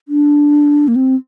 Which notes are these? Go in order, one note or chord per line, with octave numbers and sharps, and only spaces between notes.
D4
A#3
C4